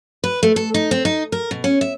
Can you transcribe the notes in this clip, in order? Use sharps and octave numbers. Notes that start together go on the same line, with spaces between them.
B4
A3
A4
D#4
C4
D#4
A#4
B2
C#4
E5